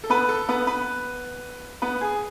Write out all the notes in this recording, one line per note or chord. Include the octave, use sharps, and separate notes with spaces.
A4
B3 B4
A4
B3 B4
B3 B4
B3 B4
G#4 G#5